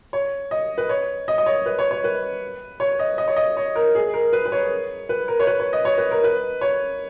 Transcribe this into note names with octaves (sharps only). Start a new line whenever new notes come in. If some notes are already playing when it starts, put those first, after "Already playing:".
C#5
D#5
B4
C#5
D#5
D#5
C#5
B4
C#5
C#5
B4
C#5
D#5
D#5
C#5
D#5
C#5
A#4
G#4
A#4
B4
B4
C#5
B4
A#4
C#5
B4
C#5
D#5
C#5
B4
A#4
B4
C#5